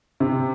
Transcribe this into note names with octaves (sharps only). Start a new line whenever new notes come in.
C3